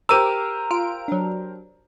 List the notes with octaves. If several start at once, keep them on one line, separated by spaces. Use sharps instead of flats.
G4 A#4 C5 A#5 D6 E6 D#7
F4 D7
F#3 D4